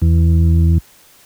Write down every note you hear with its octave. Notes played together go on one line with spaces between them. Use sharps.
E2